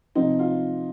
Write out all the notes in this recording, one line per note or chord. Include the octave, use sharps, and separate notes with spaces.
C3 F3 C4 D#4
F4